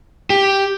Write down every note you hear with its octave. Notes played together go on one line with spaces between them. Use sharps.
G4